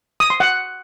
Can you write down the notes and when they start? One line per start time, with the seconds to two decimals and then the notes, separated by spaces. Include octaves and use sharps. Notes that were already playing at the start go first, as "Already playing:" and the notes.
0.20 D#6
0.30 C6
0.40 F#5